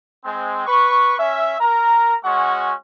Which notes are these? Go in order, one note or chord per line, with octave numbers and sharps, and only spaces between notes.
G#3 C4
B4 C#6
C#4 E5
A#4 A#5
G#3 C#4 F#4 F#5 C#6